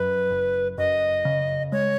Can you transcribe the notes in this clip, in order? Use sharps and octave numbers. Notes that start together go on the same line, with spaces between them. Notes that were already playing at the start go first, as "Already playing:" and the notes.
Already playing: F#2 B4
F#1
F#2 D#5
C#3
G#3 C#5